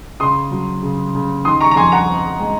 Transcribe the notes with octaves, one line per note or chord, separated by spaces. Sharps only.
C#3 C6 D#6
F#3
C#3
C#3
D#3 C6 D#6
A#5 C#6
A#5
F2 G#5 C6
F#5 A#5
C4
G#3